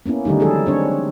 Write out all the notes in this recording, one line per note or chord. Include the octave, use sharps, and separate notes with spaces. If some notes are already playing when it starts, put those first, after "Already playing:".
A#3 B3 C#4 E4
D3 D#3 G3 A3 D#4
E3 F#3 G#3 G#4 A4
C4 D4 C#5